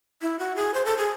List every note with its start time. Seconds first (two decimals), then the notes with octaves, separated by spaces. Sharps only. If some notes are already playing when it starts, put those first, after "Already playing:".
0.22 E4
0.39 F#4
0.56 G#4
0.74 C5
0.85 A4
0.98 G#4